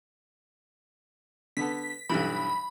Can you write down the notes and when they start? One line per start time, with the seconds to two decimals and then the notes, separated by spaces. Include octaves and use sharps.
1.57 D3 B3 A4 B6
2.09 B1 G2 E3 B5